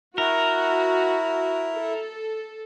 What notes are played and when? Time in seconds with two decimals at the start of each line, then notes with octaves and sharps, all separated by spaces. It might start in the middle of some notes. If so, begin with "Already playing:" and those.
0.18 E4 F#4 A#4
1.75 A4